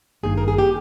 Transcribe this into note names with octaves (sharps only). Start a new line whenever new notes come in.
G#1 G2 D#3 A#3 D#4 G#4
A#4
G#4
G4